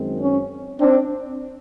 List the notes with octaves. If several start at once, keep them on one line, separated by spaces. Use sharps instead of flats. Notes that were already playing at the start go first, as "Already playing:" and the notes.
Already playing: F#2 D#3 G#3 C4
C#4
C4 D4